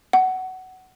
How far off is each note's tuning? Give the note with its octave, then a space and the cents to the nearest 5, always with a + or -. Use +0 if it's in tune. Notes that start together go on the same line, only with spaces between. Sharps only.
F#5 +15